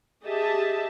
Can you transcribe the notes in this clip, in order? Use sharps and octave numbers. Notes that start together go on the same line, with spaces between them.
G4 G#4 D#5 E5 A5